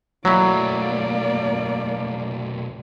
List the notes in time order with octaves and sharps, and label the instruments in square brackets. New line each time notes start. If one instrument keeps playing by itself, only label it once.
[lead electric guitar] B1 A3 [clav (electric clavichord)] F#3 E4 [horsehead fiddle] A#3 D5